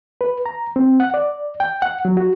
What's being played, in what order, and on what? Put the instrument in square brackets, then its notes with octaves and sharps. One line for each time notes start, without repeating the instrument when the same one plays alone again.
[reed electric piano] B4
A#5
C4
F#5
D5
G5
F#5
F#3
F#4